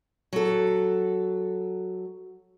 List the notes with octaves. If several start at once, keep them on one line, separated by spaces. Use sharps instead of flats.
F#3 A4